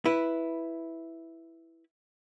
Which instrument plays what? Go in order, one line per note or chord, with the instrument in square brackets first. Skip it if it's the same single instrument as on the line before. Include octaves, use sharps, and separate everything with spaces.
[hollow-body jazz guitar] E4 B4